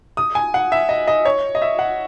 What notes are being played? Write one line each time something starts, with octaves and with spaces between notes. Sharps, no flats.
D#6
G#5
F#5
E5
D#5
D#5
C#5
D#5
E5
F#5